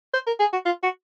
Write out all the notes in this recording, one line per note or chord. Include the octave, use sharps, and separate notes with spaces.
C5
A#4
G#4
F#4
F4
F#4